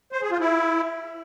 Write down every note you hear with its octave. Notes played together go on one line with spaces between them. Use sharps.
C5
G#4
F4
E4